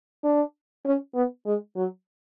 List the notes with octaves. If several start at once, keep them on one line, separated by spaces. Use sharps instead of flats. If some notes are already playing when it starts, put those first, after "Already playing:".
D4
C#4
B3
G#3
F#3